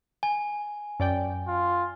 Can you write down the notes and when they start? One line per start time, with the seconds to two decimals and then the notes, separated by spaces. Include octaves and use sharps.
0.23 G#5
1.00 F#2 D5 G5
1.48 F4